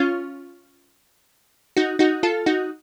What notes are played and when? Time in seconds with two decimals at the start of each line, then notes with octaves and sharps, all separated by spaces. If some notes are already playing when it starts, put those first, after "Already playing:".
Already playing: C#4 F4
1.77 D#4 F#4
1.99 D#4 F#4
2.23 F4 A4
2.46 D#4 F#4